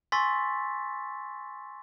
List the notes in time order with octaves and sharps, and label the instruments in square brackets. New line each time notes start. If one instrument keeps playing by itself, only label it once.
[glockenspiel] G#5 C6 C#6 E6 A6 B6